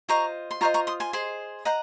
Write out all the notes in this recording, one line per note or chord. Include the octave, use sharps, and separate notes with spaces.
F4 C5 D#5 A#5 C#6
C6
F4 C5 D#5 A#5 C#6
A#5 C#6
C6 D#6
G#5 C6
G#4 C5 D#5
C5 D#5 F#5 A#5